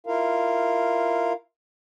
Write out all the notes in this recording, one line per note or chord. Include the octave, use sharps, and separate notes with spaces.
E4 F4 A#4 F5